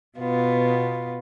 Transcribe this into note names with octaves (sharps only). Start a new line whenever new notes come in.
B2 B3 F4